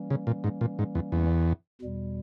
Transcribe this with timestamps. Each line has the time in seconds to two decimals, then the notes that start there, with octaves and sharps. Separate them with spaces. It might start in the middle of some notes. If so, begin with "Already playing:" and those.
Already playing: E3 G3 A#3 C#4
0.10 C#3
0.27 A#2
0.44 G#2
0.61 A#2
0.79 G#2
0.95 E2
1.12 E2
1.81 E2 B2 G3